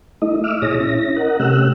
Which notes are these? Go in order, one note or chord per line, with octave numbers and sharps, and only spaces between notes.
A3 D#4 E4 D#5
D#5 E5 D6 E6 F6
A#2 E4 G#4 C#5 D#6 A#6
C#4 E4 A#6
A#4 D#5 F#5
C3 A3 C#4 G4 E6 F#6